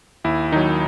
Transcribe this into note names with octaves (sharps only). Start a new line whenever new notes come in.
D#2 E4
D#3 F#3 D#4